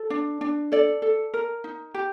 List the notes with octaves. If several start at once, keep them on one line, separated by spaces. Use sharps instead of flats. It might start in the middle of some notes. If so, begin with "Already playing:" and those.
Already playing: A4
D4
D4
A4 D5
A4
A#4
D#4
G4